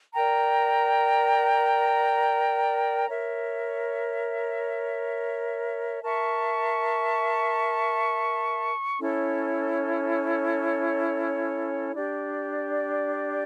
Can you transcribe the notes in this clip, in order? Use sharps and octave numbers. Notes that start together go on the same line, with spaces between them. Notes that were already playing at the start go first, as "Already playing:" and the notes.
A#4 D5 G5 A#5
A#4 C#5 E5
A#4 E5 A5 C#6
C#4 E4 A4 C#5
D4 G4 D5